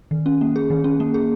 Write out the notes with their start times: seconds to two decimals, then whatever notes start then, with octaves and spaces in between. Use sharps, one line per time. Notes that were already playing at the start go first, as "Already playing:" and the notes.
0.11 D#3
0.26 C#4
0.41 A#3
0.56 G#4
0.70 D#3
0.84 C#4
1.00 A#3
1.14 G#4